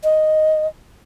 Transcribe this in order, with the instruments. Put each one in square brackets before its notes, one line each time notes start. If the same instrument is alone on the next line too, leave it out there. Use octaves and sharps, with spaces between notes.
[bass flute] D#5